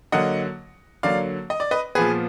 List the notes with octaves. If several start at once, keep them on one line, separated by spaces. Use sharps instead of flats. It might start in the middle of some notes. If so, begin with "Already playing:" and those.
D3 F#3 A#3 D#5 F#5
D3 F#3 A#3 D5 F5
D#5
D5
B4 D#5
A#2 F3 B3 G#4 B4